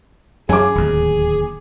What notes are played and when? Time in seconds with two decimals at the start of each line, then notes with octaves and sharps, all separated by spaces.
0.49 F#2 F#3 G#4 G#5 D6
0.75 D1 D#2